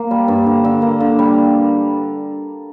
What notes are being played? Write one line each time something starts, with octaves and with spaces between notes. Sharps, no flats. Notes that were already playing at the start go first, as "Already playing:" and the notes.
Already playing: A#3
G3
G2
D3
D3
A#3
D3
G3